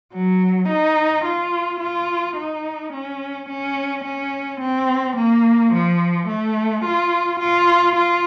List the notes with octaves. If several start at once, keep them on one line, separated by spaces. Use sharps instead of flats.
F#3
D#4
F4
F4
D#4
C#4
C#4
C#4
C4
A#3
F3
A3
F4
F4
F4